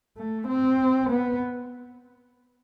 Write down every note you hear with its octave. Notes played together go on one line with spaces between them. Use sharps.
A3
C4
B3